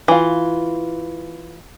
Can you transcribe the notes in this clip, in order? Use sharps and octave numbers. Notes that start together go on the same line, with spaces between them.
E3 F4